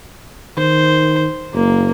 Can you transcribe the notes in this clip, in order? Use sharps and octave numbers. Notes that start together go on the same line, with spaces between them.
D#3 C5
F#1 A#3